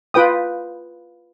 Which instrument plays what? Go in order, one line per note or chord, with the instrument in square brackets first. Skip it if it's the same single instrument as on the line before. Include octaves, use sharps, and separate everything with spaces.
[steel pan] F4 B4 G5 D#6